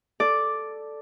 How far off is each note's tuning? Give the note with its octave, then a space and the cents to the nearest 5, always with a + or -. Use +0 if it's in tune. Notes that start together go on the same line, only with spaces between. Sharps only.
A4 +0 D5 +0